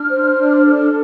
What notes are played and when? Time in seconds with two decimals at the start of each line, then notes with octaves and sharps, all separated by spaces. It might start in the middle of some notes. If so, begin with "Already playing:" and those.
Already playing: D4 F6
0.10 C5
0.38 D4
0.65 A4